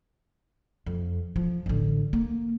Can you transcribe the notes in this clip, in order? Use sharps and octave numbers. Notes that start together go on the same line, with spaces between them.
F2
F3
A1 D3
A#3